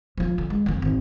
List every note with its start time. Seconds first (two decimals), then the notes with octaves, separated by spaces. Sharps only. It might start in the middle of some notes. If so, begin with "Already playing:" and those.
0.18 F3 F4
0.38 D3
0.50 G#3
0.66 F2 D#3
0.82 G#1